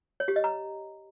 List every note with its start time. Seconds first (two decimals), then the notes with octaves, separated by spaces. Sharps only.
0.20 C#5
0.28 G4
0.36 D#5
0.44 A#5